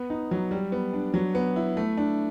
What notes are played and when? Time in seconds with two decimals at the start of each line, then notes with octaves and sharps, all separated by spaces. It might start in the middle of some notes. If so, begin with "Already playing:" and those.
Already playing: B3
0.10 D#4
0.31 F#3
0.51 G3
0.72 B3
0.93 D4
1.14 F#3
1.35 B3
1.56 E4
1.77 A3
1.97 D4